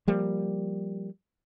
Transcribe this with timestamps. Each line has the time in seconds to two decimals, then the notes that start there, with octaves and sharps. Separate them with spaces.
0.07 F3 G3 A#3